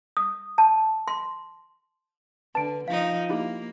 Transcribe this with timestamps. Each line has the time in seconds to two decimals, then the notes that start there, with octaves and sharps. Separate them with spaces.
0.17 D#6
0.58 A5
1.08 C6
2.55 D3 B4 A5 D7
2.88 F3 D#4 F5
3.29 A#3 D#4 E4 G4